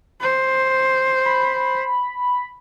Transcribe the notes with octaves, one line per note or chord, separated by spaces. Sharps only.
C5
B5